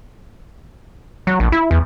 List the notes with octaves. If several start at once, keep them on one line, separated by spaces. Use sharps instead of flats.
F#3
A#1
E4
E2